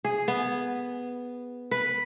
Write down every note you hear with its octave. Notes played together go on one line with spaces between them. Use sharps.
G#4
B3
B4